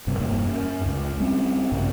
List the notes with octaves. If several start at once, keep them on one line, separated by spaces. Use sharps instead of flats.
F#1 G2 C3
E1 G2 A#3
F#2 C#4
C#2
G3 C4 C#4
A#1 G2 A#2 C#3